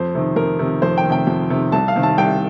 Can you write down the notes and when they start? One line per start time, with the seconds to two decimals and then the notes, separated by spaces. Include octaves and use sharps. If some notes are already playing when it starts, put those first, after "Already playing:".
Already playing: F2 C5
0.15 C3 D#3
0.36 F2 A#4
0.59 C3 D#3
0.82 F2 C5
0.98 G5
1.04 D#3
1.10 C3 G5
1.27 F2
1.50 C3 D#3
1.72 C2 A5
1.88 F5
1.96 C3 D#3
2.03 A5
2.18 C2 G5